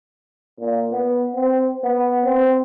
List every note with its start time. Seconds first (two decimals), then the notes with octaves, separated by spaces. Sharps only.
0.60 A#2
0.92 B3
1.35 C4
1.83 B3
2.24 C4